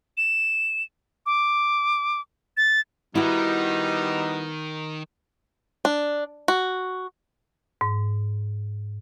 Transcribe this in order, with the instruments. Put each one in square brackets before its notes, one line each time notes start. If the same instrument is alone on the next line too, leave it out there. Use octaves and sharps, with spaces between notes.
[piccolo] E7
D6
A6
[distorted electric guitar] D#3 [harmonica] G3 B3 D#4 [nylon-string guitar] E4 F#4
[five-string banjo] D4
F#4
[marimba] G#2